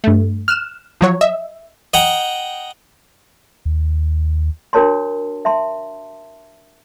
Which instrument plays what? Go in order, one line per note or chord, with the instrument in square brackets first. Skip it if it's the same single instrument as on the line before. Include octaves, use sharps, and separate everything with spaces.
[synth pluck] G2 A3
F6 F#6 E7
F3 F#3 C#5
D#5 E5
[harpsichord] D#5 F#5 G5 A#5
[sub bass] D#2
[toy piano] D4 F#4 A#4 C#5 A5 C6
E5 A5 C6